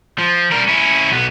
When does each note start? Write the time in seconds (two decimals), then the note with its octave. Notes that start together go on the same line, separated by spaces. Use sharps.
0.18 F3
0.51 G3 A#4
0.68 C#4 E4
1.12 B1 B3